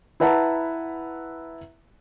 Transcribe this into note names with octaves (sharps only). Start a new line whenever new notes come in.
E4 B4 E5 F#5 A5 A#5